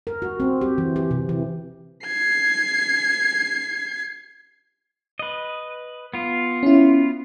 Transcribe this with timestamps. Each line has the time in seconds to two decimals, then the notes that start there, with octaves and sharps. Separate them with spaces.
0.07 A#4
0.22 F#4
0.40 C4
0.61 G4
0.78 E3
0.96 G4
1.11 C3
1.29 E3
2.06 G#6 C7
5.19 B4 D#5
6.14 B3 F4
6.63 C#4 E4